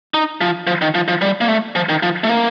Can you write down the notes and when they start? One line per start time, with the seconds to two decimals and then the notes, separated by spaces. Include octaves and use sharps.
0.14 D#4
0.41 F3
0.67 F3
0.82 D#3
0.95 F3
1.08 F3
1.22 G3
1.41 A#3
1.48 A3
1.76 F3
1.89 D#3
2.03 F3
2.24 A3
2.29 A#3